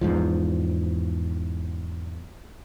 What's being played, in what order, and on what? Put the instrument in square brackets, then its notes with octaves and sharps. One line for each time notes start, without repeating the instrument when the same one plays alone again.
[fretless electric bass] E2 G#2 F3